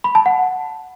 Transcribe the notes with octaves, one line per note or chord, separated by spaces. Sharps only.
B5
A5
F#5